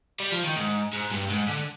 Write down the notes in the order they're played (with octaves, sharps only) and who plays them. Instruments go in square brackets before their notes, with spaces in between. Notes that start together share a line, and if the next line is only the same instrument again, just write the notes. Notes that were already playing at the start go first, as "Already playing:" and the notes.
[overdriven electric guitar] G3
F3
D#3
G#2
G#2
G2
G#2
D3